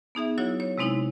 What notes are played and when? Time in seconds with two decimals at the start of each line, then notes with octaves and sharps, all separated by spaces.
0.15 B3 D#4 G#4 E5
0.38 F#3 E4 F#4 C#5
0.60 C#5
0.78 C3 G#3 C4 D#4 E4